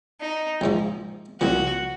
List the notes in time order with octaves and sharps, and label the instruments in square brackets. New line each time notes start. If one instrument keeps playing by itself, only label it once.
[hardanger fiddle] D#4
[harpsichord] A#1 G#2 F3
[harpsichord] C2 A#2 F3 [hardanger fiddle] F#4